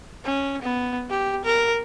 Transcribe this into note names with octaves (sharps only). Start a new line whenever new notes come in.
C#4
B3
G4
A#4